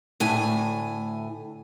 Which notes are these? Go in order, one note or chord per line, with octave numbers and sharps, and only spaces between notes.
D2 A2 G#5